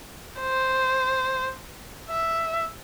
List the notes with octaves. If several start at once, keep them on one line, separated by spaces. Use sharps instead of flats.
C5
E5